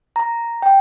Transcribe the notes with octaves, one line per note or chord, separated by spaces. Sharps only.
A#5
G5